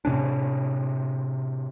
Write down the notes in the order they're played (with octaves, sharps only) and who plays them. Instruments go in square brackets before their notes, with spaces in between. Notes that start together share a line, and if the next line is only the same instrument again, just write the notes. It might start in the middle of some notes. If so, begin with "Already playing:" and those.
[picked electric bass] A2 C3 C#4 D4